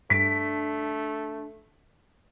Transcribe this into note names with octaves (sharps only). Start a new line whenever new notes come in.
G2 A3 D4 B6 D7